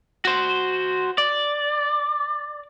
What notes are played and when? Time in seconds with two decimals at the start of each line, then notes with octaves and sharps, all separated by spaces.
0.25 F#4 C5
1.18 D5